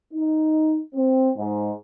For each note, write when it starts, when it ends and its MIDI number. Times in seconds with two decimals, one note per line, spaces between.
0.13 0.80 63
0.94 1.31 60
1.37 1.71 44